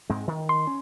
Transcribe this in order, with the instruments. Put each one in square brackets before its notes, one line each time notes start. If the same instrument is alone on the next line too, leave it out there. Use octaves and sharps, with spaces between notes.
[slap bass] G#2 G#3 C4
D#3
[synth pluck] C6
[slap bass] C#4